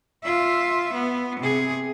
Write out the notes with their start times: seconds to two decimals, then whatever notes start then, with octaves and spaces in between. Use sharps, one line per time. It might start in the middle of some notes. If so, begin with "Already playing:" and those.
0.23 F4 E5
0.93 B3
1.40 C3 G#4